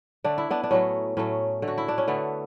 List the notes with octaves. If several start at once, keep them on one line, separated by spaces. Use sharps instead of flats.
D3 A3 D4
E4
B3 D4
D4
A2 F#3 A3 C#4
A2 F#3 A3 C#4
D3 A3
F#4
E4
D4
C#4
D3 A3 B3